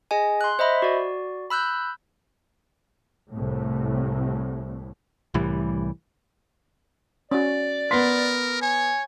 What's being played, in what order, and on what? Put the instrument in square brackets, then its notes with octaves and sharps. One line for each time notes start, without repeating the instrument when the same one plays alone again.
[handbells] G#4 D#5 G#5
C6 F#6
C5 D#5 E5 B5
F#4 D5
B5 E6 F#6 G6
[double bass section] C2 A2
[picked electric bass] C2 A2 E3 G3
[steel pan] C#4 F#4 [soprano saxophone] D5
[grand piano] B3 B6 [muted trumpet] A#4 [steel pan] C6
[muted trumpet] C#5 [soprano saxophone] G#5